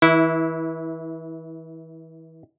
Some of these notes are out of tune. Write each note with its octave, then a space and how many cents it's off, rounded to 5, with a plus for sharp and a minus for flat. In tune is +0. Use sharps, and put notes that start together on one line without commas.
E3 -35 E4 -10